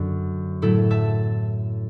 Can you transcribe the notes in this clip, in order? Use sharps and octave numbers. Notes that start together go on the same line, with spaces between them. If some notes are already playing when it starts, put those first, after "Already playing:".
Already playing: F#2 D3 F#3
A2 F#3 A3 E4 A4
E5 A5